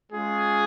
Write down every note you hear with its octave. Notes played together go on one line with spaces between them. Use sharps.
G#3 C#4 F4 G#4